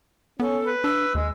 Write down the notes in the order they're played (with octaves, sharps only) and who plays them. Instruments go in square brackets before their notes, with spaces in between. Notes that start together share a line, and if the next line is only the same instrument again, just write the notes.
[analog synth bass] B3 [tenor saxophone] C#4 [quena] A4
[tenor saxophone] B4
[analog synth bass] D4 [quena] E6
[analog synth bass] D#2 [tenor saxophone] G#3